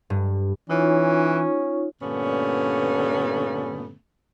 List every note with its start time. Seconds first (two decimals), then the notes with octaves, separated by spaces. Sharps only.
0.10 G2
0.70 E3 C#4 D#4 F4 C#5
2.02 G2 A#2 D3 A3 B3 C#4